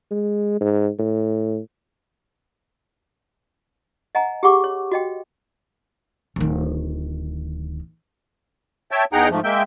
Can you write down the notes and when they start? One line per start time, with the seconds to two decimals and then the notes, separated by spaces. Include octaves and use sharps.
0.11 G#3
0.60 G#2
0.99 A2
4.15 D#5 F#5 G#5 A#5
4.43 G4 G#4 F#5 C#6 D6
4.64 C#5
4.92 F#4 D#5 G5
6.36 D1 D#3
8.91 C#5 E5 G5 A5
9.13 E2 D#4 G#4 F#5 G5 A#5
9.31 G#2 F3 A3
9.44 G#3 A#3 E5 G5 G6